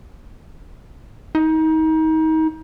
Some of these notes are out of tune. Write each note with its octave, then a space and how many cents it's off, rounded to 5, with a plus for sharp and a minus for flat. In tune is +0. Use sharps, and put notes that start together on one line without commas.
D#4 +30